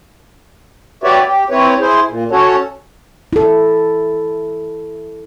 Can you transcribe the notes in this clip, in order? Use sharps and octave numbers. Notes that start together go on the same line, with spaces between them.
F#4 G4 B4 C#5 D5 E5
G4
C4 E4 B4 C#5
E4 G#4 C5
A#2
C#4 F#4 A4 C#5
E4 A4